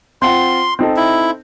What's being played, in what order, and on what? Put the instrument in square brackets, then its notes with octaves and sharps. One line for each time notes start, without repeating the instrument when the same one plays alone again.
[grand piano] C4 F4 F#5 [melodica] C6
[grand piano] C4 D#4 A4
[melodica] E4